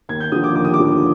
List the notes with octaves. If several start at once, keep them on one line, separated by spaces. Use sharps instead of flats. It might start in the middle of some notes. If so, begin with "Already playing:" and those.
D#2 G#6
G6
D3 F3 D#6
D6
D#2 D6
D#6
D6
D3 F3